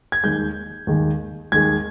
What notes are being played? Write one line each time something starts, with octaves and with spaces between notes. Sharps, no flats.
G#6
D#2 D#3 G#3 G6
D#2 D#3 G#3
D#2 D#3 G#3 G#6